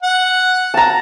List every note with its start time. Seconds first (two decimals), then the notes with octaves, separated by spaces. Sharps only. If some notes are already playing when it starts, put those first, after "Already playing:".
0.03 F#5
0.74 A5 A#5